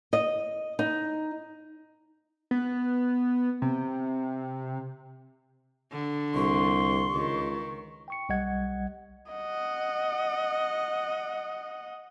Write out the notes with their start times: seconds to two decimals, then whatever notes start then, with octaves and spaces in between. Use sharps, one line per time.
0.13 D#5
0.79 D#4
2.51 B3
3.62 C3
5.92 D3
6.35 C2 C6 C#6
7.15 C#2 D#3
8.08 G5 C#6 C#7
8.29 B1 G3 D#5 F#5 G#6
9.32 D#5 F#5